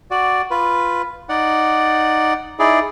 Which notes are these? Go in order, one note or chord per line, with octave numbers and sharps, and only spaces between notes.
F#4 D5
F4 B4
D#4 D5 F#5
D#4 E4 G#4 D5